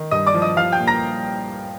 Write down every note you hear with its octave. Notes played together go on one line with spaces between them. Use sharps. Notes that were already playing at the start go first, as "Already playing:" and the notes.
Already playing: D#3
G2 D#5 D#6
D5 D6
F3
D#5 D#6
F3 F5 F6
G5 G6
A#2
A#5 A#6